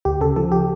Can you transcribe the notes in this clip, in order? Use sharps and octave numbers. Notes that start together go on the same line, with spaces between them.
D2 G4
C#3 A4
F3 A4
G4